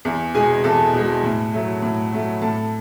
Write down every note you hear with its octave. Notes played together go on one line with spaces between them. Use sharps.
E2
B2 G#3 G#4 G#5
E2 A4 A5
B2 G#3
A2
F#3 A3
A2
F#3 A3
A2 A4 A5